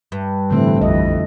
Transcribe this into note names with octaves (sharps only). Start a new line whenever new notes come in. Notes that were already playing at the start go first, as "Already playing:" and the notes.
G2
A2 D3 E3 A3 C4
A#1 F2 E3 D#5